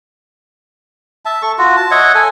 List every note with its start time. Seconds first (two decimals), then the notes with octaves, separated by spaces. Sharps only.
1.25 E5 A5
1.42 A4 C#6
1.58 F4 F#4
1.77 A5
1.91 C#5 D#5 E5 F#5
2.15 A4 G#5